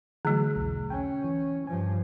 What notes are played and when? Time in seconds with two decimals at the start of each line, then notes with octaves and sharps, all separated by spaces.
0.25 D3 E3 F#3 A3
0.56 B1 E2
0.90 C#4 G5 G#5
1.24 E3
1.67 G2 F3 G#5